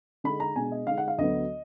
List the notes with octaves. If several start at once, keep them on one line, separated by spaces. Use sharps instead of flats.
D3 G#3 D#4 B5
A#5
B2 G#3 D4 G#5
D#5
D3 G#3 D#4 F5
F#5
F5
D2 D3 F#3 B3 D#5